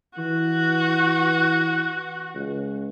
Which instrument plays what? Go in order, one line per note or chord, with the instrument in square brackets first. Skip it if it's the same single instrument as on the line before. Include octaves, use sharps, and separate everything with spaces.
[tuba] E3 [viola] F#4
[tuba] C#2